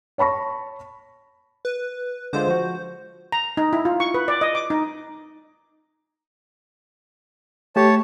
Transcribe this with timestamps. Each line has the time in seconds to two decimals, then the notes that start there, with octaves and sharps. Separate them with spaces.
0.18 C#5 A5 B5 C#6 A#6
1.65 B4
2.33 D3 G#3 F4 C5
2.48 F3 F#4
3.32 A#5
3.57 D#4
3.73 E4
3.85 F4
4.00 C#6
4.14 B4
4.28 D5
4.41 D#5
4.55 D6
4.70 D#4
7.76 A3 G4 C#5 A5